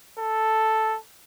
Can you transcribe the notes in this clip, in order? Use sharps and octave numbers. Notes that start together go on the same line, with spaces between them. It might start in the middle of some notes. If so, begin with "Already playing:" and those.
A4